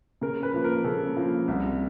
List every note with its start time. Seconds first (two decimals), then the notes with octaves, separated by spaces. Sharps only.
0.21 C#3 A#4
0.43 B4
0.54 F3 A#3
0.64 A#4
0.84 C#3 A4
1.17 F3 A#3
1.48 C2